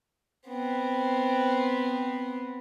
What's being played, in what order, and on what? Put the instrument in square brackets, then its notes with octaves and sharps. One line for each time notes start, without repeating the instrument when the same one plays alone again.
[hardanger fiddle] B3 C4